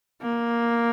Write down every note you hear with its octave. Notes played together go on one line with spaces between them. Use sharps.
A#3